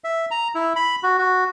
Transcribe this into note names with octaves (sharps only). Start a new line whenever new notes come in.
E5
A#5
E4
B5
F#4
F#4